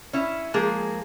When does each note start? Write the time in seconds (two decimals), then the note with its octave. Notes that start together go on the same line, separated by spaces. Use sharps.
0.13 C#4 E4
0.54 F3 G#3 A#3 G#4